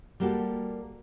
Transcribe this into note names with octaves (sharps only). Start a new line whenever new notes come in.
G3 A#3 F#4 G4 A4